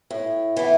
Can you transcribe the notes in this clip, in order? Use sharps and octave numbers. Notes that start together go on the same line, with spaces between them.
A2
E3 B3